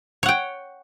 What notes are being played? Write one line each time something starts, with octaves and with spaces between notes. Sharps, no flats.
C#5 F#5 G5